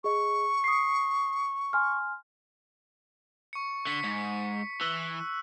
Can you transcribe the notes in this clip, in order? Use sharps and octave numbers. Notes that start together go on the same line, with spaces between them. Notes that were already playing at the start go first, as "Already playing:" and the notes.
G#4 D#5 C#6
D#6 C7
G#5 C6 F6
C#6 C#7
D3 B6 C#7
G#2
E3 E6 F#6